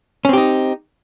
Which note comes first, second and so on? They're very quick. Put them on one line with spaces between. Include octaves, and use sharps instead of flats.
C#4 C4 G4 D#4